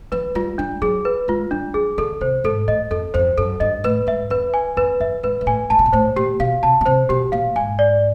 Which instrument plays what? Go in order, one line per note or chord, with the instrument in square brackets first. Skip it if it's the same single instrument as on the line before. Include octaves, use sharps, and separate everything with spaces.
[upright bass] F3 [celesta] B4
[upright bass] G3 [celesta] F4
[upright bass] G3 [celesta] D4
[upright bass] F#3 [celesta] G#4
[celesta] B4
[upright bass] G#3 [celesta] F4
[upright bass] G3 [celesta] D4
[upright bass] F#3 [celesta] G#4
[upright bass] D3 [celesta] A4
[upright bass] C3 [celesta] C5
[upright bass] G#2 [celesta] A4
[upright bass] A2 [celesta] D#5
[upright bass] F2 [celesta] A4
[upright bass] F2 [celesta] C5
[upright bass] F#2 [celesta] A4
[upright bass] G2 [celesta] D#5
[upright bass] A2 [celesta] B4
[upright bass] G#2 [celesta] E5
[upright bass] F2 [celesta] B4
[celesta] G#5
[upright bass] F2 [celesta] B4
[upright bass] F#2 [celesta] E5
[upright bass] G#2 [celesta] B4
[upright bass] G#2
[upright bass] A2 [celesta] G#5
[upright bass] G#2 [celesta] A5
[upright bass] B2
A#2
[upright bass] A2 [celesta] C5
[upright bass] A#2 [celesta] G4
[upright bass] B2 [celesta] F5
[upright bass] C3 [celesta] A5
[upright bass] B2
[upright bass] C3 [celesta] C5
[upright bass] B2 [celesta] G4
[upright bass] A#2 [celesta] F5
[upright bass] G#2 [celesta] G#5
[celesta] D5